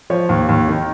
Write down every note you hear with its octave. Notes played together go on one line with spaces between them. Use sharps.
F3 C#5
D#2
D#2
D#3